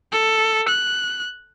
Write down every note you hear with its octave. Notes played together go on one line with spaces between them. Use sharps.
A4
F#6